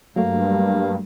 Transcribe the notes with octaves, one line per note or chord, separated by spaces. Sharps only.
G2 F#3 A3 A#3